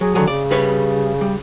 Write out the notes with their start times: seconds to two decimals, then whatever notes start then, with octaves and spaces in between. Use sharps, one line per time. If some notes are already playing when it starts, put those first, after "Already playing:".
0.01 F#3 G#4
0.15 D3 D#3 F#3 G#4
0.28 C#3 D5
0.51 G3 B4 C#5
1.21 G3